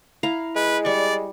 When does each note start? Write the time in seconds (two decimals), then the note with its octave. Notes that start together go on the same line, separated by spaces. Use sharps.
0.23 E4 F5 A#5
0.56 G#3 B4
0.85 G3 D5 C#6